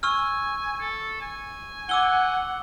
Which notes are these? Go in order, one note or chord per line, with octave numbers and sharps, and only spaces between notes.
G#5 C#6 E6 F6
A4
G#5
F#5 D6 E6 G7